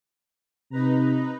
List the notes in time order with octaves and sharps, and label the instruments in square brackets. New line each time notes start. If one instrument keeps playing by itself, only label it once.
[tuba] C3 [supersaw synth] D#4 B4 A#5